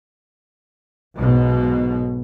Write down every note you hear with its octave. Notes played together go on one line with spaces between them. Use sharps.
B1 G#2 B2